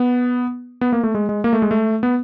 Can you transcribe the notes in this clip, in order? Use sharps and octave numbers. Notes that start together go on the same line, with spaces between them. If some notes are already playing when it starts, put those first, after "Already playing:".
Already playing: B3
B3
A#3
A3
G#3
G#3
A#3
A3
G#3
A3
B3